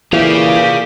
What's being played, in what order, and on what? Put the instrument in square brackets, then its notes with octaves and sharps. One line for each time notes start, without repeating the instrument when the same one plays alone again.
[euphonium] A#2 [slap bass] E3 [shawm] G4 [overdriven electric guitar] G#4 F5